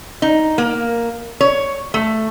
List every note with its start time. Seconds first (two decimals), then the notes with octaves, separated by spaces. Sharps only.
0.22 D#4
0.58 A#3
1.41 C#5
1.94 A3